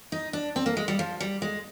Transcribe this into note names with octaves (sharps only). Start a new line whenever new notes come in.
D#4
D4
C4
A#3
G#3
G3
F3
G3
G#3